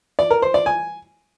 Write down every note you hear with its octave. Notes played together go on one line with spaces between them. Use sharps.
D5
A#4
C5
D5
G#5